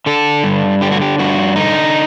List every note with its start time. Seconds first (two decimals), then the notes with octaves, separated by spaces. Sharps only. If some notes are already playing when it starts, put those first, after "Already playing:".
0.06 D3 A4
0.44 G2
0.81 D3 G4
0.92 F#4
1.02 G4
1.18 G2 F#4
1.56 D3 D#4